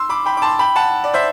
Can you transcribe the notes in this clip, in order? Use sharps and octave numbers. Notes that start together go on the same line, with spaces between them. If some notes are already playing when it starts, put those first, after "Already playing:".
Already playing: C6 E6
B5 D6
G5 B5
D6
A5 C6
G5 B5
F#5 A5
D5
C5 E5